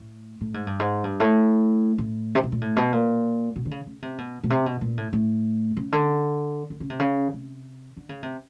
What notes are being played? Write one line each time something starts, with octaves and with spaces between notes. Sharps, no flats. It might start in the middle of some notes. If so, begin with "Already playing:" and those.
Already playing: A2
A2
G#2
G2
G#2
G2
A2
A2
C3
B2
A#2
A2
B2
A#2
B2
D3
C#3
C#3
C3
B2
B2
C3
B2
A#2
A2
A2
C#3
D3
D3
C#3
C3
C#3
C3
D3
C#3
C3